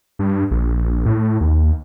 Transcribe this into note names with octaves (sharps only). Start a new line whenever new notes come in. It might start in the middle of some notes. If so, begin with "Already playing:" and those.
G2
A#1
A2
D#2